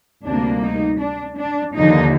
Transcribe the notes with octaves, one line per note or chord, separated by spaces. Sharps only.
D2 C3 G3 A#3 D4
D#4
D4
D4
D#2 D3 F3 D#4